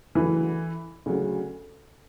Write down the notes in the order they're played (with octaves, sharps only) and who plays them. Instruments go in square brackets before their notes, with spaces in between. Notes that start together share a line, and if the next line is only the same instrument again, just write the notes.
[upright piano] D2 C#3 F#3 [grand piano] E3
[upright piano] D2 C#3 F#3